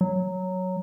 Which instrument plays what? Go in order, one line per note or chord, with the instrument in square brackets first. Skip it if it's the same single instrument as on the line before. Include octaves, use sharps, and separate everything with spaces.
[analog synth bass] F#3